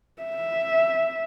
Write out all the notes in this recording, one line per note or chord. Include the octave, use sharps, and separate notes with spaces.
E5